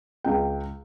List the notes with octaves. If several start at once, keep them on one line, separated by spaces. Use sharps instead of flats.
C#2 G5